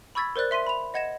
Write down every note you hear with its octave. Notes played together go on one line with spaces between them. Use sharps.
B5 C#6 E6 G#6 A6 B6
A#4 C5 D5 F#6 A6
E5 C6 B6 D#7
B5 F7
D#5 F#5 G#6 A#6 E7